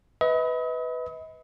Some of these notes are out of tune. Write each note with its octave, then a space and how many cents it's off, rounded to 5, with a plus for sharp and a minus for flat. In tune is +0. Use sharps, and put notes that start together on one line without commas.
B4 +10 D#5 +40